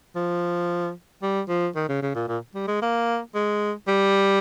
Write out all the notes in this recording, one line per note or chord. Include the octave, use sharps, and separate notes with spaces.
F3
G3
F3
D#3
C#3
C#3
A#2
A#2
G3
G#3
A#3
G#3
G3